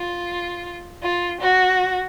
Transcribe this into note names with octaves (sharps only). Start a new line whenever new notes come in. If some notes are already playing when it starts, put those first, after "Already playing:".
Already playing: F4
F4
F#4